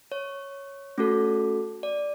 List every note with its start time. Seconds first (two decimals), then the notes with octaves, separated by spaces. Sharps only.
0.12 C#5
0.98 A3 C#4 F#4 A4
1.83 D5